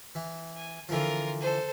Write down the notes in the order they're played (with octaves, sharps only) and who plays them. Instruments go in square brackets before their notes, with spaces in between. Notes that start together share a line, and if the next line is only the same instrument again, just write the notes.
[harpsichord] E3
[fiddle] G#5
[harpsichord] D3 E3 F3 [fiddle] F4 A#4
[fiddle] A4 C5